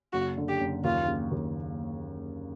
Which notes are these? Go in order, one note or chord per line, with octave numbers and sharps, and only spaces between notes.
F#1 F#4
D3
G4
F#1
D#2 F4
C#3
D#2